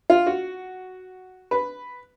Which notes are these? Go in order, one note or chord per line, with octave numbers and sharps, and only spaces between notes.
F4
F#4
B4